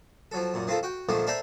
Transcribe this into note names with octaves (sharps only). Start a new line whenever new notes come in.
F3 F#3 A4
F#2 A#2
D#3 C4 F4 A4
F#4 G5
A#1 D3 D#3 F3 A3 A#3
A4 A#4 C5 D5 E5 G5